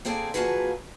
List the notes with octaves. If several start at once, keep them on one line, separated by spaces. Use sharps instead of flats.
A#3 C4 G#4 A4 D5
D3 F3 A#3 F#4 G#4 B4